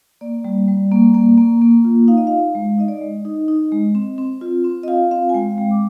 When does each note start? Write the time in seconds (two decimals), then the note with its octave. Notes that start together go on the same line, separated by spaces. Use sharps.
0.21 A#3 D5
0.44 G3
0.68 G3
0.92 A#3
1.14 A#3
1.38 A#3
1.61 A#3
1.85 F4
2.08 D#4 F5
2.17 D#5
2.27 F5
2.31 D#4
2.39 F5
2.55 G#3
2.70 F5
2.78 D#4 D#5
2.88 D5
2.98 G#3 D#5
3.25 D#4
3.48 D#4
3.72 G#3
3.95 C4
4.18 C4
4.41 F4
4.64 C4
4.83 D#5
4.88 F4 F5
5.11 C4 F5
5.29 G#5
5.34 G#3 G5
5.51 F5
5.58 G#3 G5
5.71 D6